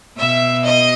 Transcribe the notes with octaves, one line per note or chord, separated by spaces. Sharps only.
B2 E5
D#5